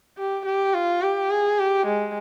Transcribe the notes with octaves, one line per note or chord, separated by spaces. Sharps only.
G4
G4
F4
G4
G#4
G4
G#3